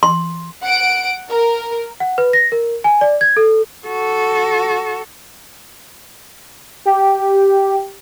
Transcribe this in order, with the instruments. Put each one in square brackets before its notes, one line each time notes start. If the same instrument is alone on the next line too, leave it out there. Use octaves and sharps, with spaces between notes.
[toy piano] C6
[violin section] F#5 D7
A#4
[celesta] F#5
B4
A#6
A#4
G#5
D5
G#6
A4
[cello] F#4 A4
[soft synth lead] G4